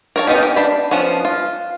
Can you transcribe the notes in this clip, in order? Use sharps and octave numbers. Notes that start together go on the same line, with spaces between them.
A#4 C#5 A5
B3 C#4 D#4 F4 G4
G4
D4 B5
F3 B3 C#4
F4